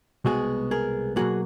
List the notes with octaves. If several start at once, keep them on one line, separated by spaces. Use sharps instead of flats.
C2 B2 G#3 B3 F#4 G#4
G#4 A#4
B2 F#3 A#3 F#4 G#4